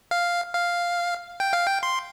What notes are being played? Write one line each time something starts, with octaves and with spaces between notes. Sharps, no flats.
F5
F5
G5
F5
G5
C6